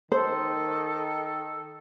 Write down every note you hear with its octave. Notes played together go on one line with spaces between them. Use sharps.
D#3 A4 C5